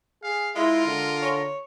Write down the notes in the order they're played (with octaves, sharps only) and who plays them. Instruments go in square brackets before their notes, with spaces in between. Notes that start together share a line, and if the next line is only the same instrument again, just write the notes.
[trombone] G#4 [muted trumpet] F5
[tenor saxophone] G#3 [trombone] E4 [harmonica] F4 [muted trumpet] A#4
[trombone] D3
[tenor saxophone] C#5